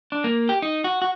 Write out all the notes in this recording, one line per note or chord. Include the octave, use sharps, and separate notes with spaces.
D4
A#3
G4
D#4
F#4
F#4